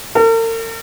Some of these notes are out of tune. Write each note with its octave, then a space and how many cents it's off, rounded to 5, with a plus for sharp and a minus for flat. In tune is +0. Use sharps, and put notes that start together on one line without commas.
A#4 -45